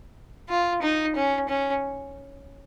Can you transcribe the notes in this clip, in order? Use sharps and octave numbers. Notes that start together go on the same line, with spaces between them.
F4
D#4
C#4
C#4